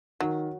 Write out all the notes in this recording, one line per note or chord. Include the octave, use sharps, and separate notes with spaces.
D#3 F#3